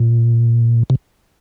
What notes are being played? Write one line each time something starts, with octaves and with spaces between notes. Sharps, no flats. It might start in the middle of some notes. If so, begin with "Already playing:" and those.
Already playing: A#2
C3